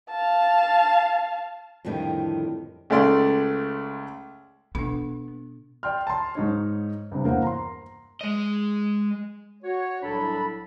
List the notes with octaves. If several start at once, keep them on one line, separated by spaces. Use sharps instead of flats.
F5 A5
F2 A2 D3 D#3 G3
C#2 A3 D5 C6
B2 B3 D4
D5 G5 C6 F6
A5 C6
G#2 D#4 C#5
G2 C3
E2 A#3 C5 F#5
A#5 C6
G#3 D#5
F#4 C#5
C2 A2 F#3 D4 A4 B5